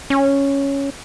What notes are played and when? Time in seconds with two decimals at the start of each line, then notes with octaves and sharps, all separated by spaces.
0.10 C#4